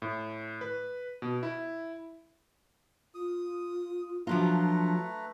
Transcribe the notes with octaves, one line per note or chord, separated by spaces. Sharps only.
A2
B4
B2
E4
F4 D#6
F3 F#3 A3 D4 F4 B4 A#5